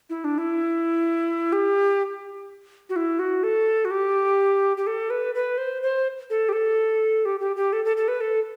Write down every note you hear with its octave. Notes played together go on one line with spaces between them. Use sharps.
E4
D4
E4
G4
F#4
E4
F#4
A4
F#4
G4
G4
A4
B4
B4
C5
C5
A4
G4
A4
G4
G4
G4
A4
A4
A4
B4
A4